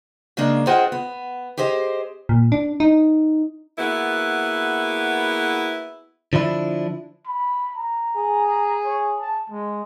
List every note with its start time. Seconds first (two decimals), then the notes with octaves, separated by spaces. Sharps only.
0.37 C#3 G#3 A#3 D4
0.67 F4 G#4 C5 D#5 F#5 G5
0.92 B3
1.57 G4 G#4 C5 D#5
2.29 A#2
2.52 D4
2.80 D#4
3.78 A#3 B3 E4 F#4 G#4 B4
6.33 D3 F3 D4 E4
7.26 B5
7.76 A#5
8.18 G#4
8.85 C#5
9.20 A5
9.50 G#3